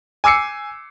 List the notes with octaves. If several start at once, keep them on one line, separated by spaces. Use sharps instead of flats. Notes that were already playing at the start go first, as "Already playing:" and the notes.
G#5 D6 E6 C7 C#7